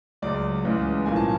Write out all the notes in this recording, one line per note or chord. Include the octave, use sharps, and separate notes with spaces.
C#2 C#3 F#3 D5
C#2 C#3 E3 G#3 B3
B1 A2 F3 A#3 G#5
A5